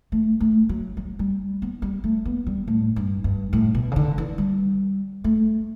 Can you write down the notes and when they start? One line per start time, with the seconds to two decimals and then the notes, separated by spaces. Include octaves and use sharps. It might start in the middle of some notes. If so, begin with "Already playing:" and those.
0.12 A3
0.40 A3
0.69 F#3
0.97 F#3
1.19 G3
1.62 B3
1.82 G3
2.04 A3
2.25 B3
2.47 G3
2.67 A2
2.96 G2
3.24 G2
3.53 A2
3.75 B2
3.92 C#3
3.96 D3
4.18 E3
4.38 G3
5.24 A3